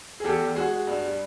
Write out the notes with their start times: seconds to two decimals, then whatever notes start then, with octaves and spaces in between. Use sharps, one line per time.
0.20 G#4
0.24 E2 G4 A4
0.41 E2
0.55 G#3 F#4 G#4
0.71 G#3
0.87 G2
1.04 G3